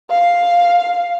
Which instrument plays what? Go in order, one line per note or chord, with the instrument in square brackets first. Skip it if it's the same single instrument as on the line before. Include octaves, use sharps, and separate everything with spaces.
[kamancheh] F5